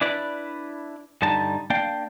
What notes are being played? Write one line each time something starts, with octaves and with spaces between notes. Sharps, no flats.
D4 E4 B4 D5
G2 D3 G3 D#4 A5
A#3 D4 D5 F5 G5